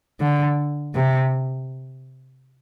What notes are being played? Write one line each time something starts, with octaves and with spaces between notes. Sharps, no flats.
D3
C3